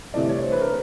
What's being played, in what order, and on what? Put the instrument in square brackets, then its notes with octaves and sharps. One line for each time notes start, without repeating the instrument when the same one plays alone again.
[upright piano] C2 C3 E3 A3 D5
C#5
C5
B4
A#4